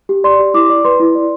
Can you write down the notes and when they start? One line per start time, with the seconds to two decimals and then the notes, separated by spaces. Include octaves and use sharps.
0.09 G4
0.24 D5 C6
0.39 G4
0.54 E4 D6
0.70 D5
0.85 B4 C6
1.00 E4
1.15 D5